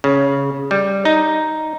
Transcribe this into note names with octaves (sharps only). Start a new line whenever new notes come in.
C#3
G3
D#4